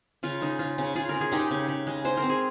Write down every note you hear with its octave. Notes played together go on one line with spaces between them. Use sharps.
C#3 F4
G#3 D#4
C#3 F4
C#3
C#3 F4 G#4
C#3 A#4
G#4
G#3 D#4 G4
C#3
C#3
G#3
G#3 C5
A#4
C4
G#4